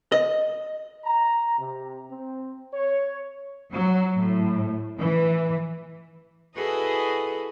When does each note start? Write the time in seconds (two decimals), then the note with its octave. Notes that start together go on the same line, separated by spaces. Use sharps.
0.12 D#5
1.05 A#5
1.58 C3
2.11 C4
2.73 C#5
3.72 F#3
4.17 A2
5.00 E3
6.56 E4 F#4 G#4 A4 B4 D#5